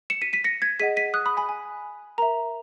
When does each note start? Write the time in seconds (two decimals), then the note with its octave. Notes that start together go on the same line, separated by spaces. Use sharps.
0.10 C#7 E7
0.22 B6 D#7
0.33 B6 D#7
0.44 A#6 C#7
0.62 G#6 B6
0.80 G#4 D#5 F#5 B6 D#7
0.97 B6 D#7
1.14 D#6 F#6
1.26 B5 D#6
1.37 G#5 B5
1.49 G#5
2.18 A#4 E5 A#5